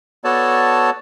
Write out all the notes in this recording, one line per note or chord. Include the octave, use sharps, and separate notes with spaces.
B3 F#4 A4 C#5 D5 A5